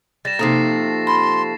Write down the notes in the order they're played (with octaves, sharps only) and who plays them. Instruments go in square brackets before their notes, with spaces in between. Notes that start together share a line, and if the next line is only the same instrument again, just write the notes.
[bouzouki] G3 [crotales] A6 A#6 E7
[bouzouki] C3 F3 A3 [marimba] A#3 D#4 [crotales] A6 C7
[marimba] B5 [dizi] C6